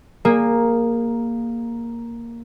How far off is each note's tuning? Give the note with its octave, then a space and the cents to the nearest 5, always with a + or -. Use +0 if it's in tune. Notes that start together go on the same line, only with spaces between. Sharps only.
A#3 +0 G#4 -15